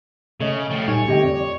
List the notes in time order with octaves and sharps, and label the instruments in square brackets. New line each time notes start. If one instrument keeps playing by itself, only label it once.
[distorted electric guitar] C#3 [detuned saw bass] A3 [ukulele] C#5 D#5
[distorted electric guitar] F3 G3
[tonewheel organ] A#2 G3 D#4 [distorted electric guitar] C#5 [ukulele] G#5
[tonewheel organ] D3 C4 [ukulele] G4 D#5 G5
[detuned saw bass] F2 [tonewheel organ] D5